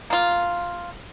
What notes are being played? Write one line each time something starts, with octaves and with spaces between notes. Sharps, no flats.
A#3 F4